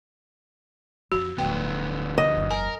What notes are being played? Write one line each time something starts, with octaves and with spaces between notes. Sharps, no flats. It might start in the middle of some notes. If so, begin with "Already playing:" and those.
F2 D3 F#4
D1 D2 A2 B3 G5
C#2 D#5
F#1 E2
A#4 G#5